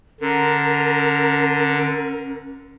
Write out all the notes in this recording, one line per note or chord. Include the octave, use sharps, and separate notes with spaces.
D3 C#4 A#4